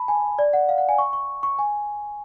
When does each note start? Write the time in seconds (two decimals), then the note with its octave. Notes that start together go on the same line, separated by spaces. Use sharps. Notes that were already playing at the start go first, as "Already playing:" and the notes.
Already playing: A5 B5
0.08 G#5
0.39 D5
0.53 F#5
0.69 F5
0.78 F#5
0.89 G#5
0.98 C#6
1.13 C#6
1.43 C#6
1.59 G#5